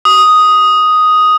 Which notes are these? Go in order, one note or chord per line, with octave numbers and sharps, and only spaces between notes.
D#6